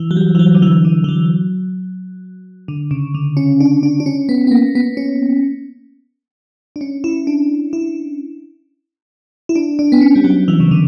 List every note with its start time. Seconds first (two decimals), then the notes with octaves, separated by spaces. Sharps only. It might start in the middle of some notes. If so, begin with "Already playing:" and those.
Already playing: E3
0.11 F#3
0.17 G3
0.35 E3
0.39 F#3
0.55 D3
0.62 E3
0.85 D3
1.04 E3
1.09 F#3
2.68 D3
2.91 C#3
3.14 D3
3.37 C#4
3.60 D4
3.83 D4
4.00 D4
4.06 C#4
4.29 B3
4.47 B3
4.51 A#3
4.75 B3
4.97 C#4
6.76 D4
6.81 C#4
7.04 E4
7.27 D4
7.73 E4
9.49 E4
9.56 D4
9.79 D4
9.92 B3
10.01 C#4
10.16 G3
10.24 F#3
10.48 E3
10.60 C#3
10.71 D3